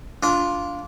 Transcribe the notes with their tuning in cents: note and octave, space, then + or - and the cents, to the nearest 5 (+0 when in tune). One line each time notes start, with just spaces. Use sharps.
D4 -20 F4 +0